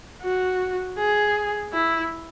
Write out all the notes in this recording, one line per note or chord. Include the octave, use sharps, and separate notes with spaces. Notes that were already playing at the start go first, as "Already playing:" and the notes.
F#4
G#4
E4